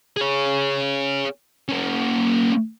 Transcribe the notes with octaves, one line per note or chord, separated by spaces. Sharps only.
G#4 C#5
A#3 C#4